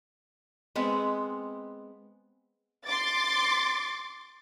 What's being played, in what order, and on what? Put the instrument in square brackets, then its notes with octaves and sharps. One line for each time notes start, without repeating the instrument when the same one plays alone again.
[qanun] G#3 B3 C4
[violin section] C6 D6 A6